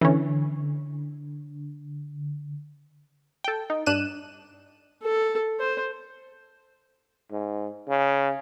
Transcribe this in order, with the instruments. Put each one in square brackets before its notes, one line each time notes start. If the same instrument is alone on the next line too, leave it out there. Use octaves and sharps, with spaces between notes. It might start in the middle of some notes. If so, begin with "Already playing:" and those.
[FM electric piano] D3 [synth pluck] E3 C#4
[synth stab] A4 G5
D#4
G2 D4 F#6 D#7 E7
[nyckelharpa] A4
C5
[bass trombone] G#2
C#3